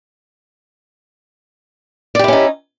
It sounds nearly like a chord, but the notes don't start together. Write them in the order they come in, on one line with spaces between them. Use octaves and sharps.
D5 G4 E4 C#4 D#4